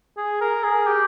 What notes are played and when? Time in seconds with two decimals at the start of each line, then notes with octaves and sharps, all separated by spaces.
0.17 G#4
0.41 A#4
0.63 G#4
0.87 G4